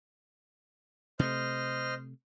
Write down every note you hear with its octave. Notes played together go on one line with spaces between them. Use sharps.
C3 A3 C5 D#5 F6